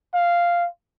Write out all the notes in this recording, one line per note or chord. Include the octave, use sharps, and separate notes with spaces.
F5